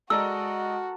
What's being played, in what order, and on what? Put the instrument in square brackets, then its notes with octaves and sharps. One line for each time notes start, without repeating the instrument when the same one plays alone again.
[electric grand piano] G#3 D5 D#5 [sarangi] F#4 [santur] A4 A#4 [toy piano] E6